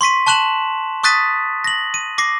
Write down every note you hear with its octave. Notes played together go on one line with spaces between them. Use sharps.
C6 C#6 B6 D#7
A5 C#6 F#6 E7 F#7
C#6 D#6 F#6 A6 B6 D#7
A#6 F#7
D#7
D6 A#6 C7